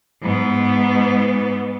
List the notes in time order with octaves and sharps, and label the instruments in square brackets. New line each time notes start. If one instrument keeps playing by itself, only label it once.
[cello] G#2 B3